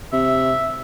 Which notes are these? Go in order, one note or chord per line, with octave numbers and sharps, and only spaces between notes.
C3 E5